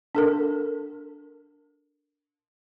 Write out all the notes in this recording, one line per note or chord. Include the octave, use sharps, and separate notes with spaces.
D4 A4 A#4